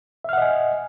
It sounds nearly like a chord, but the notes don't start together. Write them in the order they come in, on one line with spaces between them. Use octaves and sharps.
E5 F6 F#5 D#5 G#5